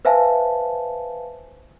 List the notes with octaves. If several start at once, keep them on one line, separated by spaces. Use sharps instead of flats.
B4 C5 E5 F5 G#5 A5